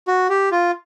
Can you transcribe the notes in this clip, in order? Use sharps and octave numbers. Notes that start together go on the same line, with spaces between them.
F#4
G4
F4